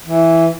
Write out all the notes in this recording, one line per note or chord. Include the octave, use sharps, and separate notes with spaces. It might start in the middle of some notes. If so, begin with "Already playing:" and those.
E3